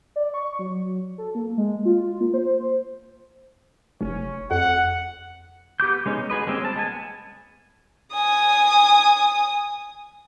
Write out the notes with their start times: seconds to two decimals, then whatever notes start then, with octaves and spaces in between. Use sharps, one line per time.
0.16 D5
0.34 C#6
0.59 F#3
1.18 A4
1.35 A#3
1.58 G#3
1.85 F4
2.21 A#3
2.34 C5
4.01 F1 C#4 C#5
4.51 F2 F#5
5.80 B3 G4 D6 G6
6.06 G#3 B3 C#4 D#4
6.30 F#4 G#4 B4 D#5
6.47 G3 G#3 A#3 C4 C#4
6.65 A5
6.76 G#3 B3 G#5
8.13 G#5 D#6